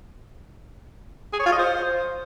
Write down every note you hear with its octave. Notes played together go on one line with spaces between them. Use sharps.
G#4
C#5
F4
D#5
C5